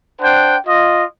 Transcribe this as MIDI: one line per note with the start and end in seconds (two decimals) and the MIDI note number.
0.21 0.56 62
0.21 0.56 72
0.21 0.56 78
0.21 0.56 79
0.67 1.04 65
0.67 1.04 75